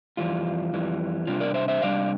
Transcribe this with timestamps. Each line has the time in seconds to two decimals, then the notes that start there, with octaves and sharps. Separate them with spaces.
0.17 F2 E3 G3 F4
0.73 F2 E3 G3
1.27 C3 G3 D4 F4
1.40 A#4 D5
1.54 C5 E5
1.68 C5 E5
1.82 C3 G3 D4 D5 F5